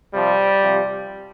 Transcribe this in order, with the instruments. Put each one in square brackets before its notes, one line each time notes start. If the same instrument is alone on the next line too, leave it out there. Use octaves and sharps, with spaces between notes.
[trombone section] C3 F3 G3
C3 F3